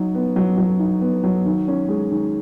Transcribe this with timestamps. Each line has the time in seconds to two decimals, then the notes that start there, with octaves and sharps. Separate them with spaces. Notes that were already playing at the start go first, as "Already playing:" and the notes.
Already playing: F#3 D#4
0.15 B3
0.36 F#3
0.57 F#3
0.79 D#4
1.01 B3
1.24 F#3
1.45 D#3
1.68 C#4
1.89 G#3
2.11 D#3